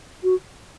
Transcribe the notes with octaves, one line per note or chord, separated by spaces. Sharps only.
F#4